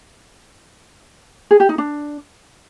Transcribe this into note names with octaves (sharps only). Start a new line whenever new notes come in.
G#4
G4
D#4
D4